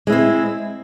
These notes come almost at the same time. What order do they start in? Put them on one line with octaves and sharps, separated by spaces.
G#3 E4 C4